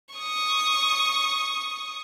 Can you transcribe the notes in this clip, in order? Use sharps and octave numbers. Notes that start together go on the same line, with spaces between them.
C#6 D#6